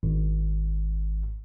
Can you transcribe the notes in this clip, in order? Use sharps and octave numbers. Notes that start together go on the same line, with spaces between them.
G#1